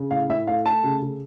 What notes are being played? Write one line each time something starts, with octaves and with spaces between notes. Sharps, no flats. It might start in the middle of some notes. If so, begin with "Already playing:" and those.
Already playing: C#3
A2 F5
A2 E5
A3 F5
A3 A5
C#3
C#3